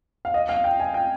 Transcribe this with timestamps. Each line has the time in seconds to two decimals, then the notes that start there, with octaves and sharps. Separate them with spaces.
0.25 F5
0.34 D#5
0.49 F5
0.64 G5
0.80 G#5
0.94 G5